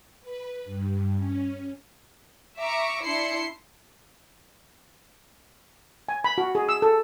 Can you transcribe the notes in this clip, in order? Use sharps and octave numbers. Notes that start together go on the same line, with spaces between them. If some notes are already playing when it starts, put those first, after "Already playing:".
B4
G2
C#4
E5 A#5 C#6 D6
D4 E4 C6 C7 C#7
G#5
B5
F#4
G#4
E6
A4